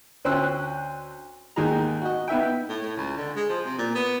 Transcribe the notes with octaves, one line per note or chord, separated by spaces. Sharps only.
D2 C#4 C5 G5 E6 F#6
D#2 G#2 D#4 G#4 A#5
F#4 D#5
B3 D#4 E5 G5
A2
A2
C#2
D3
G#3
F3
C3
A#2
B3